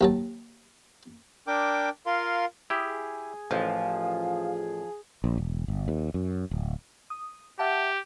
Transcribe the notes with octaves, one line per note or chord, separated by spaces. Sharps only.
D#2 F#3 A5
D4 A#4 G5 D6
F4 A#4 F5 C6
E4 G4 G#4
A1 F3 F5
A#1
E1
G1
D#2
F#2
D1
D#6
G4 E5 F#5 A5